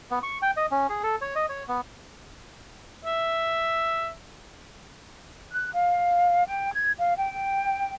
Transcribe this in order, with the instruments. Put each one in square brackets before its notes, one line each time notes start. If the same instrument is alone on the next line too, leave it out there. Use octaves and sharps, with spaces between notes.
[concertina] B3
C#6
G5
D#5
C#4
G#4
A4
C#5
D#5
C#5
B3
[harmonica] E5
[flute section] F#6
F5
G5
G#6
F5
G5